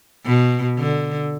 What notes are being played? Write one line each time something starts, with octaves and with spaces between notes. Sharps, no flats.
B2
D3